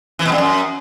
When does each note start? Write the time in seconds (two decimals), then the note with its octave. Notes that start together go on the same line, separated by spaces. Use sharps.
0.19 E3
0.25 B2
0.32 G2
0.38 F#2